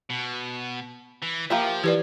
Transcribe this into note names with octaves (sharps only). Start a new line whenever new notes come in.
B2
E3
F3 A#3 G4 E5
E3 G4 B4 D5 G#6